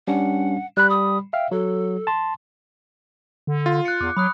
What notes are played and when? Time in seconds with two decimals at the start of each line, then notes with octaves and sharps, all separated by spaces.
0.07 G3 C#4 D4 F#5
0.77 G3 B5 F#6
0.90 D#6
1.33 E5 F5 G5
1.51 F#3 A4
2.07 A5 C6
3.47 D3
3.66 F4
3.85 F#6 C#7
4.01 E2 D6
4.17 F#3 B5 D#6 F#6